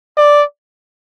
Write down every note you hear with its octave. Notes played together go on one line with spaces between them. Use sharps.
D5